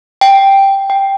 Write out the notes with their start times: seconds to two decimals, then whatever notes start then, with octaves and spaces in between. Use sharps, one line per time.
0.21 G5
0.90 G5